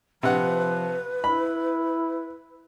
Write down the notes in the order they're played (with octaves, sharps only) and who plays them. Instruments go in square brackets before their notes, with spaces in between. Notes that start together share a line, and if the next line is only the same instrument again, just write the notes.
[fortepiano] C3 F#5 [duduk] F3 [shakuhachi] B4
[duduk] E4 [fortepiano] B5